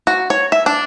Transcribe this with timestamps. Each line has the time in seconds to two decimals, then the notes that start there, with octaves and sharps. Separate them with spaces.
0.07 F#4
0.30 C#5
0.52 E5
0.66 D4